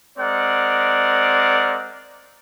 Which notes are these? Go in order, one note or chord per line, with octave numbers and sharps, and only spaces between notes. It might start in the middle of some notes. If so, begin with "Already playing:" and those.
G#3 C4 A#4 D5 F#5